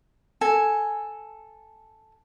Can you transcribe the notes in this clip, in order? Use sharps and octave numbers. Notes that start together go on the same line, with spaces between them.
A4 G#5